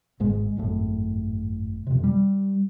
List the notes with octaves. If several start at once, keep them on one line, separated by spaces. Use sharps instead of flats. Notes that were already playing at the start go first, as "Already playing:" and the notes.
G#1 G#2 G#3
G#1 F#2 A2
F2 C3
G3